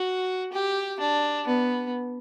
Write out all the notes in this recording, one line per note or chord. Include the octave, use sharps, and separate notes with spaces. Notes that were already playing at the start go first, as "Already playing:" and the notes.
Already playing: F#4
G4
D4
B3